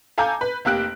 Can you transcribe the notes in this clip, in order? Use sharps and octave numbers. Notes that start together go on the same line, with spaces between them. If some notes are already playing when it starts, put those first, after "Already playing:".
A4 F5 G#5 A#5 D6 G6
B4
F1 A#3 G4 F#6 D7